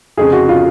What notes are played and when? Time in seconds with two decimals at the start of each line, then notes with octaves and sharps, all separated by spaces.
0.17 F1 F2 C#3 G#4
0.33 F#4
0.49 F4
0.52 C#3